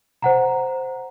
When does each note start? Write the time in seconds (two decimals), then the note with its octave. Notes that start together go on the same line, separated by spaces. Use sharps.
0.22 C5 F#5 A#5